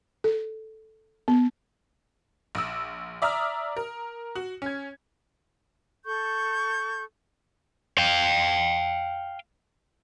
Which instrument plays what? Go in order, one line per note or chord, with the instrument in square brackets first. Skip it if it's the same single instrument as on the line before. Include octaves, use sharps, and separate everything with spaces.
[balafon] A4
B3
[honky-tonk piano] A#1 E6
D5 E5 A#5 D#6 F6
A#4
F#4
C#4 G#6
[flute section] A4 C#6 G6
[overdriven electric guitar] F5 G5